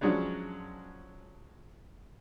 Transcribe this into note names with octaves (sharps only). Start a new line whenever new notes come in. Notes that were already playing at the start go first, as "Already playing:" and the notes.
F3 F#3 G#3 C#4 D4